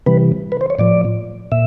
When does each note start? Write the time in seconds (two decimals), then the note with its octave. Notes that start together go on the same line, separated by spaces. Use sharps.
0.06 C3 E3 G3 B4
0.52 B4
0.61 C5
0.70 C#5
0.79 A2 F3 D5
1.52 A#2 E5